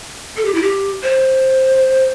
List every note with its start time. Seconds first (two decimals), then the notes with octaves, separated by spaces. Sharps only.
0.37 A4
0.45 G4
0.54 E4
0.62 G4
1.03 C5